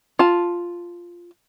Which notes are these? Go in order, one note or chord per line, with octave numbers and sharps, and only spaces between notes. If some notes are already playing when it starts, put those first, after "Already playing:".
F4 A5